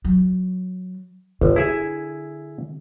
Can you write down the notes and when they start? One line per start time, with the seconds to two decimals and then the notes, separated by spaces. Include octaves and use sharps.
0.05 F#3
1.41 G1 D3
1.56 E4 G#4 E5